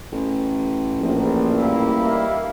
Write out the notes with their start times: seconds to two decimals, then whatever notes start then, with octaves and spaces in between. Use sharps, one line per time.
0.12 A1
0.99 A#1
1.53 G3 A#3 E4
2.07 D#2 E5 F5